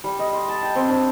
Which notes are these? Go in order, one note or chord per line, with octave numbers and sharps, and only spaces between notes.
G3
D#5
C6
A5
G5
C4
D4